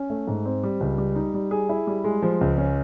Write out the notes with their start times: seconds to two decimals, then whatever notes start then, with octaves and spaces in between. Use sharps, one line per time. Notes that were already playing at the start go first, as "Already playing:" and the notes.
Already playing: C#4
0.10 A3
0.28 G#2
0.45 C4
0.63 G3
0.80 C#2
0.98 G3
1.16 D#4
1.34 G3
1.51 G#4
1.69 E4
1.87 G3
2.04 G#3
2.22 F3
2.41 C#2
2.58 C#4